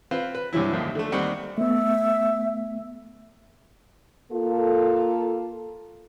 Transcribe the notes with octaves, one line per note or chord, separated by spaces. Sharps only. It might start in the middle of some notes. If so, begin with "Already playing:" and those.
C4 F4 B4
B4
G2 C3 E3 F#3 E4
A1 D#2 F3
D3 A3
D#2 G3 C4 F#5 C#6
A3 B3 E5
A#3 F4 A4